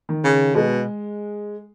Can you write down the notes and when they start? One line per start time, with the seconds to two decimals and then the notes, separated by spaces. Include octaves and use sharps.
0.09 D#3
0.24 C#3
0.55 B2 G#3